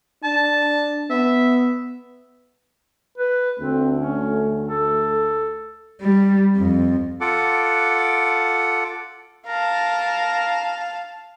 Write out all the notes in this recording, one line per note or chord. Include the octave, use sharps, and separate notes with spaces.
D4 A5
B3 E5
B4
D2 A3 C4
C#4
A4
G3
F2
F4 A4 F#5 D6
A#4 F5 A5